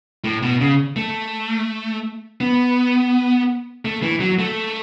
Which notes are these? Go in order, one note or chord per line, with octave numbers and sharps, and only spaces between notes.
A2
B2
C#3
A3
B3
A3
E3
F#3
A3